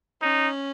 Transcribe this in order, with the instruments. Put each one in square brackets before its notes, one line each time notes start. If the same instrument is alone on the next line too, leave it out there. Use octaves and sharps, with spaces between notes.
[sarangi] C#4 [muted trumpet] D#4